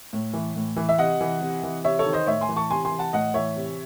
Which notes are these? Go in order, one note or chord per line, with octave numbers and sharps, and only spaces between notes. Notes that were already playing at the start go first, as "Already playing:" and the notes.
A2
E3
A2
E3
E5
C3 D#5 F#5
E3
C3
E3
C3 C#5 E5
A4 C#5
D#3
C5 D#5
A2 C#5 E5
G#5 C6
E3
A5 C#6
C3 G#5 C6
G#5 C6
E3
F#5 A5
A2 D#5 F#5
E3 C#5 E5
C3